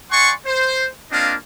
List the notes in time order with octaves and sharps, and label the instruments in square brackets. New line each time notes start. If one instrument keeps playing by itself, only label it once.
[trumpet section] D5 F#5 G#5 C6 C#6
C5
A#3 C4 D4 F4 D#5 F5